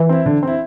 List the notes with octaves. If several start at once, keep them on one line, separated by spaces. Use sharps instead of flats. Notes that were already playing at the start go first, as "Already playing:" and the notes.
Already playing: E3
C4 E4
D3
C4 E4